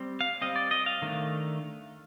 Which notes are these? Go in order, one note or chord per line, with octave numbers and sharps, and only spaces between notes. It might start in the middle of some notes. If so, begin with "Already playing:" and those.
Already playing: G3 C4
F5
G3 C4 D#5
D5
D#5
F5
D#3 A3 D4